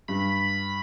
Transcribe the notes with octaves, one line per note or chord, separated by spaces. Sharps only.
G2 B5